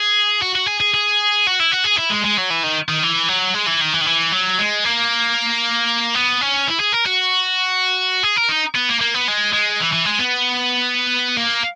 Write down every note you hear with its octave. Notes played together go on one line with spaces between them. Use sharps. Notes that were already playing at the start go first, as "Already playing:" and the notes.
Already playing: G#4
F#4
F#4
G#4
G#4
G#4
F#4
E4
F#4
G#4
E4
G#3
G#3
F#3
E3
D#3
D#3
E3
F#3
G#3
E3
D#3
E3
D#3
E3
F#3
G#3
A#3
B3
C#4
E4
G#4
A#4
F#4
G#4
A#4
D#4
B3
A#3
A#3
B3
G#3
G#3
E3
E3
G#3
B3
A#3